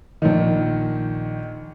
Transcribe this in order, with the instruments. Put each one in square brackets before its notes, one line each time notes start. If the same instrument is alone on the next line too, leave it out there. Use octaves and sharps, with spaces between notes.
[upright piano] A#1 D#3